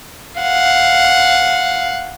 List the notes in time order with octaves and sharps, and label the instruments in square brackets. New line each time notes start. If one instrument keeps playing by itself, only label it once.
[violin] F5 F#5